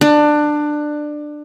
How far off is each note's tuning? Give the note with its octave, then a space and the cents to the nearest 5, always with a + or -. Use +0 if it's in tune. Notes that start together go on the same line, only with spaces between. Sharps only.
D4 +20